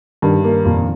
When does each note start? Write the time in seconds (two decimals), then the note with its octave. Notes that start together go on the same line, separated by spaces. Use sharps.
0.22 G2 D#3
0.44 A#3
0.65 F2 A#2